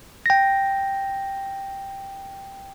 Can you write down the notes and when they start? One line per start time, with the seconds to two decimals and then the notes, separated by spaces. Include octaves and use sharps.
0.26 G5 A#6